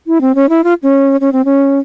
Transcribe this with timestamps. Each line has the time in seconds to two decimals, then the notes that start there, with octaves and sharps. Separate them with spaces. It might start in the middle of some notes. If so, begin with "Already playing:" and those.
0.07 E4
0.21 C4
0.35 C#4
0.49 E4
0.64 F4
0.83 C#4
1.21 C#4
1.32 C4
1.45 C#4